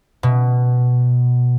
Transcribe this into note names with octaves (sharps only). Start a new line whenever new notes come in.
B2